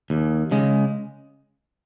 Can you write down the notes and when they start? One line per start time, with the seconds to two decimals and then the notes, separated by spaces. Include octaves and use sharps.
0.10 D#2
0.51 C#3 G#3